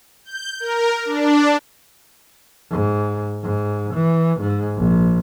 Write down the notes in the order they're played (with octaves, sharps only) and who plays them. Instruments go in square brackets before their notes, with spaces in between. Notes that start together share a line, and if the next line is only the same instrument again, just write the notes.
[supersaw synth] G6
A#4
D4
[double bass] G#2
G#2
E3
G#2
A#1